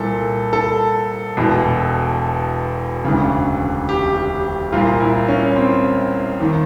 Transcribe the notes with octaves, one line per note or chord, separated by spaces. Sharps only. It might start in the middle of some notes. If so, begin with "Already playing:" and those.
Already playing: C2 A#2 A4
A4
E1 E2 B2
E1 D2 C#3
G4
G4
C2 A#2 F4
E4
C#4
C4
D#2 D#3